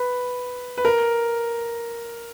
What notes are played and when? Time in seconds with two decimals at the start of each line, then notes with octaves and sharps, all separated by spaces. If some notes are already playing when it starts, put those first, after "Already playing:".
Already playing: B4
0.78 B4
0.85 A#4